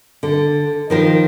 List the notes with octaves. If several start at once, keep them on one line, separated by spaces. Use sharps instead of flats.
D3
D#3 F3 A#4